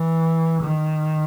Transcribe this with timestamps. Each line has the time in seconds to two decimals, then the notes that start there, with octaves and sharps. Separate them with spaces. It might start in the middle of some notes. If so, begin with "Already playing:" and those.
Already playing: E3
0.63 D#3